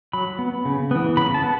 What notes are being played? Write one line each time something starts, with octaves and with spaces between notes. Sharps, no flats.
F#3 B5
B3
C#3
E3 B3
C#3 B5
A5
B3